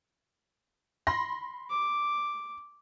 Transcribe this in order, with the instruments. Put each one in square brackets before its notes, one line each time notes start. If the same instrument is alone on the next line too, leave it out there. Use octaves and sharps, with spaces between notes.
[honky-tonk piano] B5 C6 A#6
[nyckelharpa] D6